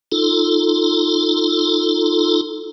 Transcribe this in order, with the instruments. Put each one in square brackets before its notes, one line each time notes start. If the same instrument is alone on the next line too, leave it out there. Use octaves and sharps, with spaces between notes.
[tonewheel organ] D#4 F4 A4